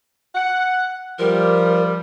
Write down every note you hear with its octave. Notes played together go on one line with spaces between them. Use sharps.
F#5
F3 G3 A#4